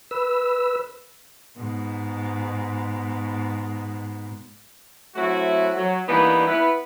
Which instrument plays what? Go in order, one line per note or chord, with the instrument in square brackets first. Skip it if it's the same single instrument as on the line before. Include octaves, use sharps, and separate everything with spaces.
[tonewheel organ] B4 E6
[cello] G#2 B2
[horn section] F#3 A3 C4 E4 F#4
F#3
E3 G3 A#3 B3 D4 D#4
B3 E4 B4